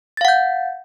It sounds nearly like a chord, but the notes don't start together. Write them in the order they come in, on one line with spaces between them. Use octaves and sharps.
A6 F5 F#5 G6